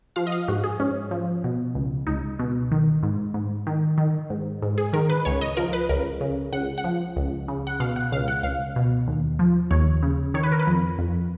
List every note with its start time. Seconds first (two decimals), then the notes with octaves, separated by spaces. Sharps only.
0.16 F3 F5
0.27 D#5
0.32 F5
0.48 G#2 F#4
0.64 G#4
0.80 G#2 C#4
1.11 F3
1.44 B2
1.75 C#2
2.07 C#2 D#4
2.39 B2
2.71 D#3
3.03 G#2
3.34 G#2
3.67 D#3
3.98 D#3
4.30 G#2
4.62 G#2
4.78 G#4
4.93 D#3 A#4
5.10 B4
5.25 C#2 C#5
5.41 D#5
5.57 F3 A#4
5.73 B4
5.89 C#2 A#4
6.21 C#3
6.53 C#2 F#5
6.78 F#5
6.84 F3
7.16 C#2
7.48 C#3
7.67 F#5
7.80 B2 F5
7.96 F#5
8.12 C#2 F5
8.28 F#5
8.43 C#2 F5
8.76 B2
9.08 D#2
9.39 F3
9.71 D#2 C#5
10.03 C#3
10.34 D#3 C#5
10.43 B4
10.52 A#4
10.59 B4
10.67 F2
10.98 F2